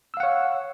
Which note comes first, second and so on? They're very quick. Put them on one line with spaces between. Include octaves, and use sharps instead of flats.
E6 F5 F#5 C#5